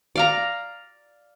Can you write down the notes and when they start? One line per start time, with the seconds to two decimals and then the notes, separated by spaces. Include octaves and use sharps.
0.16 D5 F5 A#5